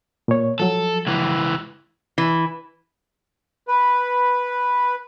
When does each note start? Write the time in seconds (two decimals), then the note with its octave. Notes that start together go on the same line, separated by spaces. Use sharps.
0.28 A#2 C#5
0.60 F3 F#3 A4
1.07 C#2 E3
2.18 E3
3.68 B4